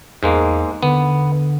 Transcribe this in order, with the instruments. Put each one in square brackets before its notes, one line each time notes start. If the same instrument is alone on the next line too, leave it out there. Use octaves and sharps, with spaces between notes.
[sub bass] E2 [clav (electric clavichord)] G#2 G#3 A#3
[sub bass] D3 [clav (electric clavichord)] B3